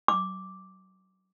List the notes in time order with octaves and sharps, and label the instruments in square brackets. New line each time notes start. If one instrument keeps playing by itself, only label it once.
[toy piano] D6